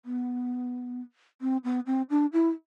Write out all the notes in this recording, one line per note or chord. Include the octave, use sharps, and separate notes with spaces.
B3
C4
B3
C4
D4
E4